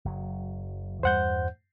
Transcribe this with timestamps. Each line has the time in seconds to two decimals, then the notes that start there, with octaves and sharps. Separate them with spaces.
0.05 F#1 F#3
1.03 E2 G2 G3 C5 F#5 G6